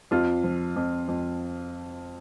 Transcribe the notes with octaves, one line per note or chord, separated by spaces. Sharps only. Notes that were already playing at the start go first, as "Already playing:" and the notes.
F2 F4
F3
F2
F2